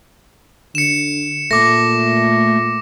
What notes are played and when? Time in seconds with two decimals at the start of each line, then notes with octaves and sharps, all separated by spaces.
0.75 D3 C#7 E7
1.51 A#2 A3 D6 A#6